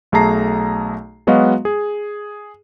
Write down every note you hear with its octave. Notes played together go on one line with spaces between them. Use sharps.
B1 A3 G#4 A5 A#5 C7
F#3 G#3 B3 F#4 D#5 F5
G#4